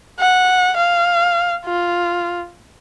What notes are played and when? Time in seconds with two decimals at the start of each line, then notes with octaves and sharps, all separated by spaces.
0.20 F#5
0.77 F5
1.66 F4